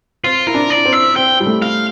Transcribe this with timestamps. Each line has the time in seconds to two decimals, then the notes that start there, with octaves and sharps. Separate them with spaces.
0.24 C4 F4
0.47 E4 A#4
0.54 D4
0.70 D5
0.85 C4
0.93 E5
1.16 C4 G5
1.40 G3
1.46 A3
1.62 F5